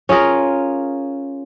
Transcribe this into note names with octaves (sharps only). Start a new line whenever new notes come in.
C#4 F4 G#4 A#4